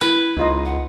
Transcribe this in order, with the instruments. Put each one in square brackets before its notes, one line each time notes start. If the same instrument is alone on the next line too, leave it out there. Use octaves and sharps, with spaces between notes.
[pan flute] E4 [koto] B4
[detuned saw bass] C#2 [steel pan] D#4 F4 D#5
[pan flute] F#5